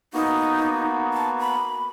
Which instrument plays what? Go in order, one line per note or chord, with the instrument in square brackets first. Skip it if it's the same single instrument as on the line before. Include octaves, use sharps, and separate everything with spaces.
[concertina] A#3 B3 F#4 [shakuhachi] D#4
[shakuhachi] A5
B5